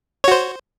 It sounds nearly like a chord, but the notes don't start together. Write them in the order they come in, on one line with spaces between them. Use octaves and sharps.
C#5 F#4 C5